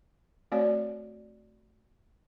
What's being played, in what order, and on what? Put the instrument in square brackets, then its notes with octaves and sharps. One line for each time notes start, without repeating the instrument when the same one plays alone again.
[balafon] A3 C4 F#4 C#5 D5